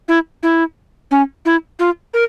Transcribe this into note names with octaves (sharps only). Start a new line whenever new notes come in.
E4
E4
C#4
E4
F4
A#4